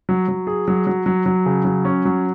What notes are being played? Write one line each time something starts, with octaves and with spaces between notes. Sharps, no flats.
F#3
F#3
G#4
F#3
F#3
F#3
F#3
C#3
F#3
C#4
F#3